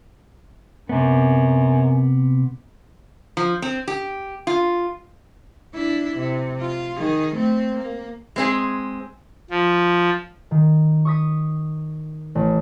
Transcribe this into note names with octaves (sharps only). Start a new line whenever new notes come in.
F#2 C3 B3
F3
C4
G4
F4
D4 E4
C3
F4
D#3 G#4
A3 C4
A#3
G#3 C4 G#4
F3
D#3
C#6 D#6 B6
A1